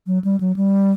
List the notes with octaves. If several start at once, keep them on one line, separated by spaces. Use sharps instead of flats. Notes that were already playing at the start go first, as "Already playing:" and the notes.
F#3
G3
F#3
G3